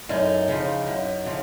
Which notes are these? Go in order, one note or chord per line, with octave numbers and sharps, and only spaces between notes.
F#2 D#4
C#3 F3
F#2
C#3 F3